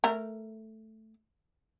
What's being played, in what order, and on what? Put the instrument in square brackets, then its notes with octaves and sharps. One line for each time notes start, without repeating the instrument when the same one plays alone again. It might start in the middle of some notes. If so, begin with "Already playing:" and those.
[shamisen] A3 A#4